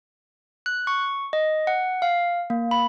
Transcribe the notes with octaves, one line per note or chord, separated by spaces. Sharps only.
F#6
C#6
D#5
F#5
F5
A#3
B5